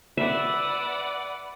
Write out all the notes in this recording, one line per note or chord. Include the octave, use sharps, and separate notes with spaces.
B4 D5 E5 F#5